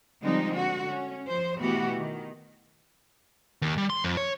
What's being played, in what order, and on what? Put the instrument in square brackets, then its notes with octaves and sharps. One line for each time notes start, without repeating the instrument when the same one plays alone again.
[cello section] D3 F3 G3 G#3 C4 D#4
D3 F#4
C#4
F3 C5
B2 E3 A3 B3 F#4 G4
D#3
[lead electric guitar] D#2
G3
C6
F2
C#5